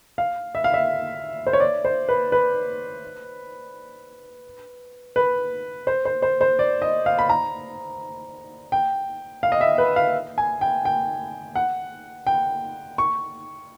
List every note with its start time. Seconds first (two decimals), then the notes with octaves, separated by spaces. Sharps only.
0.18 F5
0.55 E5
0.64 F5
0.74 E5
1.47 C5
1.53 C#5
1.60 D5
1.85 C5
2.09 B4
2.32 B4
5.16 B4
5.87 C5
6.05 C5
6.22 C5
6.41 C5
6.59 D5
6.82 D#5
7.06 F5
7.19 B5
7.29 A#5
8.72 G5
9.43 F5
9.52 D#5
9.61 E5
9.78 B4
9.96 F5
10.38 G#5
10.61 G5
10.85 G5
11.55 F#5
12.27 G5
12.98 C#6